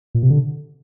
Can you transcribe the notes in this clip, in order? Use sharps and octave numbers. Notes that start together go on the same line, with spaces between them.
A#2
C3
D3